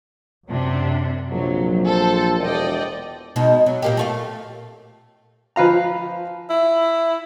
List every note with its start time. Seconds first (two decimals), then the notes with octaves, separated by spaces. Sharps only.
0.48 F#2 C3 D4
1.32 A#1 C3 F#3
1.84 A4 C5
2.40 E1 D5 D#5 G5
3.36 B2 G#3 D#4
3.66 F#3
3.82 A#2 A#3 G4
3.97 A3 C#5 F5
5.56 F3 B4 F5 A#5
6.50 E4